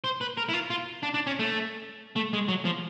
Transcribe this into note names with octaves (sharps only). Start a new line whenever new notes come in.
C5
B4
A#4
E4
F4
F4
D4
D4
C#4
A3
A3
G#3
F#3
F3